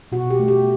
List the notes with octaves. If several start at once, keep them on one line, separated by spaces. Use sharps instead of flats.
B2 F#4
G4
A3
G4